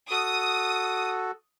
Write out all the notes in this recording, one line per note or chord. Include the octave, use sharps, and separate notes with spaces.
F#4 A4 D#6